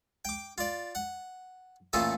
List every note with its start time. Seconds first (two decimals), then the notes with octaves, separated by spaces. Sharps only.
0.25 G5 D6
0.58 F4 D5
0.95 F#5
1.93 A1 A#2 A3 F4 A4 D#6